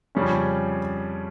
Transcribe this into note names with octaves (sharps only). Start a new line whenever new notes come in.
F2 C#3 G3 C#4